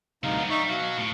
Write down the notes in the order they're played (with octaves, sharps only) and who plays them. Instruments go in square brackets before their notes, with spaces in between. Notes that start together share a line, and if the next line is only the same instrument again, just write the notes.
[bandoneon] D2 D#4 F5 [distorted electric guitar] G2 C3
[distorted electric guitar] F#3 B3
[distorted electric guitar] G3 [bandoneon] D#4 E5 C#6
[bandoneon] B2 F5 [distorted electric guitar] F#3 F#4
[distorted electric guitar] A2